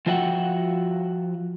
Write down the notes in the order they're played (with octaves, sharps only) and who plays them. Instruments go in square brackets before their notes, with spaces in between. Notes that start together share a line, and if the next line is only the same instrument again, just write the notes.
[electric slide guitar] F3 F4 F#4 E5 F#5 G5